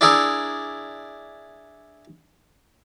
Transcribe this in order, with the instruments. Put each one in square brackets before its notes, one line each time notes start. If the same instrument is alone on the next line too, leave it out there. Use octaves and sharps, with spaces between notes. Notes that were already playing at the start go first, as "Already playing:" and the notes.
[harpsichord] D4 E4 G#4 A#4 E5